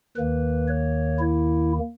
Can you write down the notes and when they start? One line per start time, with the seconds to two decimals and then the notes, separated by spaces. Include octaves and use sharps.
0.16 D#2 D#3 A#3 B4
0.68 C#5
1.19 E4